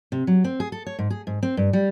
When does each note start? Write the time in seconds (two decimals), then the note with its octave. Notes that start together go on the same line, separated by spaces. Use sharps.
0.12 C3
0.27 F#3
0.44 C4
0.60 G#4
0.72 A4
0.86 C#5
0.99 G#2
1.10 G#4
1.27 G#2
1.43 C4
1.57 G2
1.73 G3